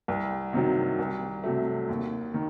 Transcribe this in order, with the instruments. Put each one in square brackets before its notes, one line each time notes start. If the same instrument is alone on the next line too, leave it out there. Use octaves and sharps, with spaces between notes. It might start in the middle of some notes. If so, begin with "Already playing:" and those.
[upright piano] C2
C3 D#3 F#3
C2
C3 F#3 A3
D#2
D#3